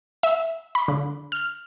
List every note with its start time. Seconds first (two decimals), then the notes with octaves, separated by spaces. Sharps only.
0.23 E5
0.75 B5
0.88 D3
1.32 F6